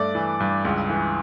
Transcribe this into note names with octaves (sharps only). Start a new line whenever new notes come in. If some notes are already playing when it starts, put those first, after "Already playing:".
Already playing: G2 A3 D5
E3
G2
C#2
E3